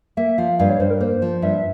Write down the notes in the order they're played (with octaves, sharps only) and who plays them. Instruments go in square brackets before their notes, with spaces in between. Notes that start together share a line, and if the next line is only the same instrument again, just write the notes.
[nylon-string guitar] A#3 [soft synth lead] E5
[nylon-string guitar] F3 [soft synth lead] F5
[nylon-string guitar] G2 [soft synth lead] F5
[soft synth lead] C#5
[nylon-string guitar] G2 [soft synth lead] C5
[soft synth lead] A#4
[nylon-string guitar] A#3 [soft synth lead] C5
[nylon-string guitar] F3
[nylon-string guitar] G2 [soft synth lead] E5